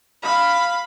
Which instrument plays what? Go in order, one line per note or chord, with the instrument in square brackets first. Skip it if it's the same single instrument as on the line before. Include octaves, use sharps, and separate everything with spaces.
[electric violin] F5 [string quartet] B5